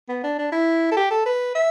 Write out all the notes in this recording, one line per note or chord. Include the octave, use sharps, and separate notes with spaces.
B3
D4
D4
E4
A4
G4
A4
B4
E5